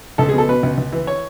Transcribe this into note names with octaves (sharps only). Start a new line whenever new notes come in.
C#2 A4
G#4
B2 A4
B2 B4
C#2
C#2
E3
C#5